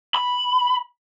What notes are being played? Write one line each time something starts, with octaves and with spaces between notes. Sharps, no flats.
B5